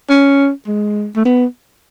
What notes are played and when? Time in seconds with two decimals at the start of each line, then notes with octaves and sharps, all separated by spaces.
0.10 C#4
0.67 G#3
1.16 A3
1.25 B3